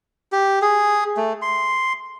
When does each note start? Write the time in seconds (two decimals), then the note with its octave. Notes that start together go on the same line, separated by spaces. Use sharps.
0.32 G4
0.62 G#4
1.17 A3
1.42 C6